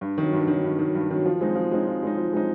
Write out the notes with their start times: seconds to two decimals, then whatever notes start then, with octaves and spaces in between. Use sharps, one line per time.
0.01 G2
0.18 D#3 F#3
0.33 G2
0.48 D#3 F#3
0.64 G2
0.79 D#3 F#3
0.95 G2
1.10 D#3 F#3
1.26 F3
1.41 G#3 C4 D#4
1.55 F3
1.71 G#3 C4 D#4
1.87 F3
2.03 G#3 C4 D#4
2.18 F3
2.33 G#3 C4 D#4